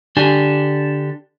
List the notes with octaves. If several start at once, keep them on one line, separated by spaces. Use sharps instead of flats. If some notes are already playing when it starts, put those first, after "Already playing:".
D3 D4 G4 G#5